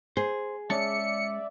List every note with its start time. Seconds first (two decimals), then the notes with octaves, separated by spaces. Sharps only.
0.17 G#4 C5
0.70 G#3 C#4 D5 E5 A5 C#7